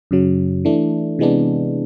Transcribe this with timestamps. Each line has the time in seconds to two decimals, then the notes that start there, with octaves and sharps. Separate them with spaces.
0.11 F#2 C#3 F#3
0.65 E3 A3 D4
1.19 C3 E3 G#3 B3 D4